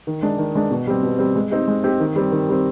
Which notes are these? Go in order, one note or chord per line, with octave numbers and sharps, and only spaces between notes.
D#3
G#3 D4
D#3
G#3 D4
B2
G3 C4
B2
G3 C4
G#3
C4 D#4 G4
G#3
C4 D#4 G4
D#3
G3 C4
D#3
G3 C4